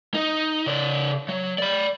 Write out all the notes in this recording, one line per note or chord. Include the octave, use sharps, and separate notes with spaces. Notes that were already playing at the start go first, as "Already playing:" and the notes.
D#4
C#3 D5
F#3
D5 B5